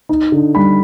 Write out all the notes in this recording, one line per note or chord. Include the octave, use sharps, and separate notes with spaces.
D#4
D3
G3 B5